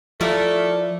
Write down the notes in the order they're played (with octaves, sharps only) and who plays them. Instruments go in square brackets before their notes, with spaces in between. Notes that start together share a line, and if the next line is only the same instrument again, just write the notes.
[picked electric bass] F3 [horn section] A3 [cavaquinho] E4 A#4 D5